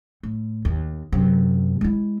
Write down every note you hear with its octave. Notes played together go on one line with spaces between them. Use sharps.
A2
D#2
F#2 C3
G#3 E4